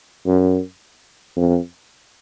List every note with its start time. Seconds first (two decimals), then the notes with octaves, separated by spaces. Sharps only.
0.26 F#2
1.36 F2